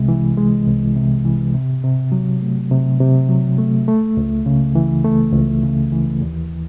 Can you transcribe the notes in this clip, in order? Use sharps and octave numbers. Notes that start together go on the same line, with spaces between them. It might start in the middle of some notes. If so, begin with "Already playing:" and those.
Already playing: C2 C3 G#3
E3
G#3
C2
C3
E3
C3
C3
F#3
A3
C3
C3
F#3
A3
A3
C#2
C#3
E3
A3
C#2
C#3
E3
D#2